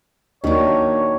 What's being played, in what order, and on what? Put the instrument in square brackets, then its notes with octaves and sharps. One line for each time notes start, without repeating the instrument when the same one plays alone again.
[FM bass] D#2 [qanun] D#3 F#3 [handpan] A#3 D4 [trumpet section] C#5